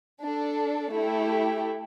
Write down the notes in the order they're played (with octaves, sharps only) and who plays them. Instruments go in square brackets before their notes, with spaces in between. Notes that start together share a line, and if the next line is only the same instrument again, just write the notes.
[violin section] D4 A4
A3 E4 G4